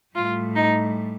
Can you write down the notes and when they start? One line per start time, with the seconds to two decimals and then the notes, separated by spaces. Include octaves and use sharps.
0.15 A2 G3 F4
0.55 D#4